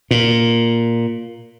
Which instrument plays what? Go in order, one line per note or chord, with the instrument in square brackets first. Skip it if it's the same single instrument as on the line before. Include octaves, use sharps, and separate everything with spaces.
[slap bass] A#2